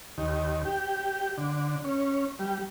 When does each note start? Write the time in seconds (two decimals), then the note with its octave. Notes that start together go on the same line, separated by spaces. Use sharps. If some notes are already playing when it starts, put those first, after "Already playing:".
0.18 D#2
0.65 G4
1.38 D3
1.84 C#4
2.39 G3